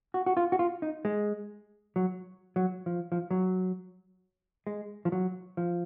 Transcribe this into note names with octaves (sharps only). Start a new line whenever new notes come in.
F#4
F#4
F4
F#4
F4
D#4
G#3
F#3
F#3
F3
F3
F#3
G#3
F3
F#3
F3